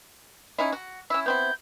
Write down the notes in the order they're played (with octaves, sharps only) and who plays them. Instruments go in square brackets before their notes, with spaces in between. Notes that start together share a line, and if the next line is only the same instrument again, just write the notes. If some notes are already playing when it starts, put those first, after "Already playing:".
[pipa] C#4 D#4 E4
F#4
[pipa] C#4 E4 [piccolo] E6
[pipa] B3 C4 E4 [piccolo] G6